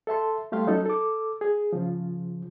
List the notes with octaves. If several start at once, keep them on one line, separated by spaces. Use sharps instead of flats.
A4 E5 A5 C6
G3 A3 G4 F5 C6
F#3 C#4 D#4 F#4 A4
A4 D6
G#4
C#3 F3